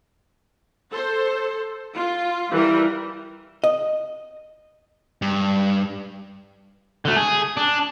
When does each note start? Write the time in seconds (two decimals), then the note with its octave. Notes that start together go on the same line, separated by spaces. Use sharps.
0.91 A4 C5
1.95 F4
2.51 E3 G3 A#4
3.64 D#5
5.22 G2
7.05 D3 A3
7.16 G#4
7.57 D4